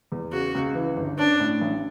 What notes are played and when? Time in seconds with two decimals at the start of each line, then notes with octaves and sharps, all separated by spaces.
0.12 E2
0.32 C#3 F#4
0.55 C#2
0.75 E3
0.97 G1
1.19 C#4 D4
1.40 A2
1.61 A1